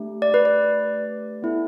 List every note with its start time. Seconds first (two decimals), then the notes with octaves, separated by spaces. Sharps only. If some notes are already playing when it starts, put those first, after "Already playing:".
Already playing: A3 D4 G4
0.22 D5
0.34 B4
0.45 D5
1.42 B3 E4 A4